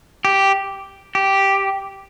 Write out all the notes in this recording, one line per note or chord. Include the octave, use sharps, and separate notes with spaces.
G4
G4